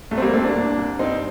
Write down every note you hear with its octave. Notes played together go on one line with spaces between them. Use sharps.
C2 A3
C4
G3 A#3
C2 A3 C4
A#3 D4
C2
C2
G2 C4 D#4